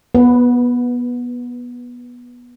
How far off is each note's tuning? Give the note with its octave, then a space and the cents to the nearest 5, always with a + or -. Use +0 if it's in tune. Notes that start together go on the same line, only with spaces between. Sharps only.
B3 -20 B4 +5